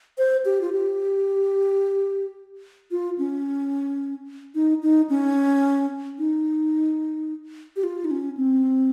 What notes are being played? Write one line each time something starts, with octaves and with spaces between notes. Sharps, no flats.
C5
G4
F4
G4
F4
C#4
D#4
D#4
C#4
D#4
G4
F4
D#4
C#4
C4